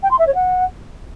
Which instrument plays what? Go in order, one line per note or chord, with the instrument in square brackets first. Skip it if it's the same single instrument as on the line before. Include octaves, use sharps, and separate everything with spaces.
[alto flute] G5
C6
E5
C#5
F#5